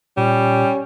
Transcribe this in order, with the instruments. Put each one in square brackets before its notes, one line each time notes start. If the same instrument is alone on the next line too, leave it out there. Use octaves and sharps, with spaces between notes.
[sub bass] A#2 [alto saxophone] G3 [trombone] C#4